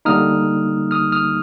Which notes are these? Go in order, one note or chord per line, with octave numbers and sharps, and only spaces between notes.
D3 G3 A#3 D#4 D#6 F6
D#6 F6
D#6 F6